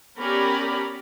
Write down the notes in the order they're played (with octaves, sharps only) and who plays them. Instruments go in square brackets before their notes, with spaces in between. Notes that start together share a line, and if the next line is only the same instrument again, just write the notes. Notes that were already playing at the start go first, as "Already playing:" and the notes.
[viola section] B3 C#4 G4 A#4 D5 B5